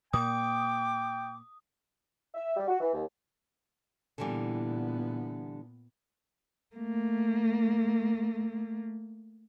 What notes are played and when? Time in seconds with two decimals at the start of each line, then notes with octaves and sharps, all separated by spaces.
0.13 A#2 A#3 G5 D6 D#6
2.35 E5
2.56 G3
2.68 F#4
2.80 E3
2.94 D#2
4.18 A#2 D3 E3 G3 B3
6.76 A3 A#3